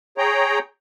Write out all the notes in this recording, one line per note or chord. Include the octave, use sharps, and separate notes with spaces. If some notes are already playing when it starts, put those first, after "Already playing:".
G#4 C#5 G5 A#5